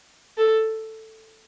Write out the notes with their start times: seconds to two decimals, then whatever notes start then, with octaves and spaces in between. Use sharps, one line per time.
0.37 A4